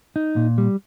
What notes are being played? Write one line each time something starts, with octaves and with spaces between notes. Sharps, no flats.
D#4
A#2
G3